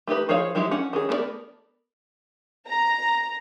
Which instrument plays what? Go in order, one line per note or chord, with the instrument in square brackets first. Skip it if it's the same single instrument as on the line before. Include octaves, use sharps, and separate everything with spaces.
[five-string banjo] A3 D#4 G4 B4
F3 G#4 C5 C#5 F5
F3 F#3 G#3 E4 G4
C#4 F#5
D#3 C#4 G#4
A3 B3 G#4 A#4 D5
[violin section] A#5